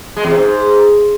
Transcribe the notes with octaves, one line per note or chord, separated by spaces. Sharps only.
G#3
E2
C3
G#2